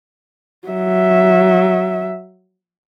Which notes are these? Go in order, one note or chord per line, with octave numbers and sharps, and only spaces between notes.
F#3 E5